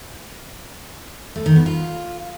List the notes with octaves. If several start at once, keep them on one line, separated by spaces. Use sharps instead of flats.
A3
D#3
B3
F4